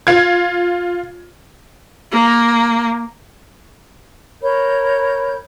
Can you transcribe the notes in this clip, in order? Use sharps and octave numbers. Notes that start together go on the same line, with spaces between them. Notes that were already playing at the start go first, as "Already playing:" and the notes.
F4 G#6
A#3
A#4 C#5 B5 G6